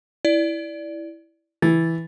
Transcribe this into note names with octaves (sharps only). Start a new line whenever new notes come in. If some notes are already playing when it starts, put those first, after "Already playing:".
E4 D5
E3 A6